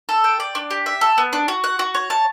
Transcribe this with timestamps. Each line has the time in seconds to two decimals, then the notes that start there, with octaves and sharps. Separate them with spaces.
0.09 A4
0.24 G5
0.40 D5
0.55 D4
0.70 G4
0.86 E5
1.01 A4
1.18 B3
1.33 D4
1.48 F#4
1.64 F#5
1.79 F#4
1.95 C#5
2.10 A5